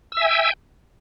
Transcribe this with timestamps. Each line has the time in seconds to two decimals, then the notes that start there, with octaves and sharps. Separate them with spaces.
0.12 E6
0.17 E5
0.22 G#5
0.26 G5